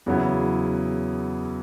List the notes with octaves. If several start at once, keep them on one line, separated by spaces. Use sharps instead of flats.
E2 C#3 F#3 B3 E4